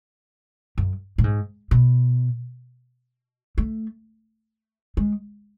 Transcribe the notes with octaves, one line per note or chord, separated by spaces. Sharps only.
F#2
A2
G#2
B2
A3
G#3